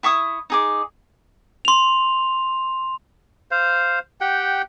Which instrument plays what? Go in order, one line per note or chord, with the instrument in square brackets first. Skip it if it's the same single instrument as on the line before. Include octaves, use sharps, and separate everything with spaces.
[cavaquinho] E4 E5 C#6 D#6
D#4 G#4 D6
[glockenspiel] C6 F7
[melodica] C5 F5
G4 F#5 G5